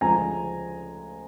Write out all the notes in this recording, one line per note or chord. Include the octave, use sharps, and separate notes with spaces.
D2 C#3 F3 G#3 G#5 A#5